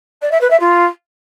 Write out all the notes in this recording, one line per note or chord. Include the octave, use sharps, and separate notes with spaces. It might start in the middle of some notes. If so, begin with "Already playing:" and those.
D5
E5
B4
E5
F4